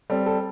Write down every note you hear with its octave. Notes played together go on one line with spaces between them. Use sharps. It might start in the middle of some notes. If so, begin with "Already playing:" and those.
G3 C4 A4
A4